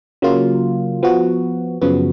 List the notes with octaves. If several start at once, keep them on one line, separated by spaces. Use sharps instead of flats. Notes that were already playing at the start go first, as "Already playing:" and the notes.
C#3 F#3 A#3 F4
F3 B3 F#4
F#2 C#3 F3 B3 F#4